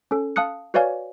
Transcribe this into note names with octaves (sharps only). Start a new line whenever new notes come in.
C#4 A4
F5 A5 D#6 F#6 C#7
F#4 B4 C#5 D5 F5 G#5